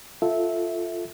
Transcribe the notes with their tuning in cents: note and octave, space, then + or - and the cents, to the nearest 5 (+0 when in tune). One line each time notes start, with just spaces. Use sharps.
F4 +0 A4 +0 E5 -15